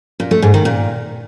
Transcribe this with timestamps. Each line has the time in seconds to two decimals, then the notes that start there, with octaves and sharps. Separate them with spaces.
0.20 A#2
0.31 A3
0.42 G#2
0.54 D#3
0.65 A#2